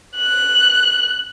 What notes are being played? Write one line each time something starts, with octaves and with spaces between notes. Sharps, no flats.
F#6